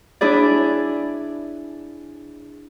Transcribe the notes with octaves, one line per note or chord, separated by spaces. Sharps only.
D4 E4 G#4 D5